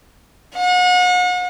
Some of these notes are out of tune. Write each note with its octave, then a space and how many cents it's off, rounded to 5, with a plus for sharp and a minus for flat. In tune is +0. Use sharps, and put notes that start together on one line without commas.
F#5 -40